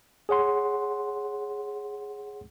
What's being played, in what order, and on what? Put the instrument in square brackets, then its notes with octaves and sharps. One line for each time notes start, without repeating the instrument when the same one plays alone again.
[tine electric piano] G#4 C#5 F#5 C6